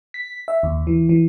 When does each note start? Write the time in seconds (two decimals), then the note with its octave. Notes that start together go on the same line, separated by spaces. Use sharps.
0.14 B6
0.48 E5
0.63 D#2
0.87 E3
1.09 E3